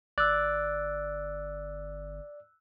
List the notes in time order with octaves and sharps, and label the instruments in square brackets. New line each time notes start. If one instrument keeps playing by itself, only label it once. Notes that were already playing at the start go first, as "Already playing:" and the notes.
[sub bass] G1 [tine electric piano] D5 [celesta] E6 F#6